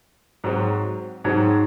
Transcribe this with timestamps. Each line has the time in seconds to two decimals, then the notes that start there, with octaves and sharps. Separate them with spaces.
0.44 G#2 F#3 C4
1.24 G#2 F#3 C4 D#4